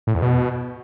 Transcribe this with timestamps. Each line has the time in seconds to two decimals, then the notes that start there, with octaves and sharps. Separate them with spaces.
0.07 A2
0.15 E2
0.22 B2